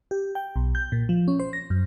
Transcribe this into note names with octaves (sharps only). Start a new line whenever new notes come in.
G4
G5
B1
G6
A#2
F3
C#4
C5
A#6
F#2